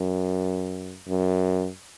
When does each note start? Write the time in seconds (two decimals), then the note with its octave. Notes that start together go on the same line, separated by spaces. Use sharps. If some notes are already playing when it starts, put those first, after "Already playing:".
Already playing: F#2
1.08 F#2